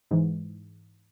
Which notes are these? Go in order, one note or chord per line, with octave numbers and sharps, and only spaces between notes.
G#2 E3